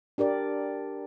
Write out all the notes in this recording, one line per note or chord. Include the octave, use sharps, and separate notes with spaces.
D4 G4 A#4 D5